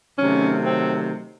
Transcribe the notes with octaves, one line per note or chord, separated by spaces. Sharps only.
C3 D#3 F#3 A3 C#4
C4